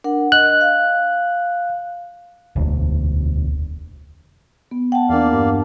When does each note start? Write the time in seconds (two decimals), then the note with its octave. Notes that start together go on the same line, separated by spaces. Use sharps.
0.04 D4 A#4 F#5
0.32 D#5 F#6
0.61 F5
2.56 E1 D2
4.71 B3
4.92 F#5 G5 A5
5.09 E2 A#3 D4 D5 F5
5.33 G2